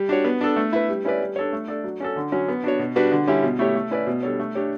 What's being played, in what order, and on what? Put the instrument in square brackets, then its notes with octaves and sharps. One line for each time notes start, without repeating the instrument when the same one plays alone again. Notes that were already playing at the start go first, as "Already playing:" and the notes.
Already playing: [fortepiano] G3
D4 F#4 C#5
B3
D4 A4
A3
E4 B4
G3
C#4 E4 B4 D5
G3
D4 A4 C#5
A3
D4 A4 D5
F#3
C#4 F#4 A4
D3
F#3 C#4
B3
D4 F#4 C#5
B2
G3 D4 F#4 B4
D3
G3 C#4 E4 G4
B2
A3 E4 G4 C#5
A3
C#4 E4 B4 D5
B2
G3 D4 A4 C#5
A3
D4 G4 C#5